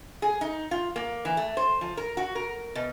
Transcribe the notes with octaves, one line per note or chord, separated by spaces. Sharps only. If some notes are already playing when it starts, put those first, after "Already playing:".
G#4
D#4
F4
A#3
E3
A3
C5
F3
A#4
F#4
A#4
B2